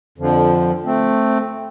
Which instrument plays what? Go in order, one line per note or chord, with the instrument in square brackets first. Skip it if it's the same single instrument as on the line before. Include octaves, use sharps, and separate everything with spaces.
[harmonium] F2 D3 F3
A3 C4